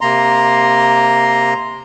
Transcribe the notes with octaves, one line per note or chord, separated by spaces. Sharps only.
C3 A#3 A#5 C6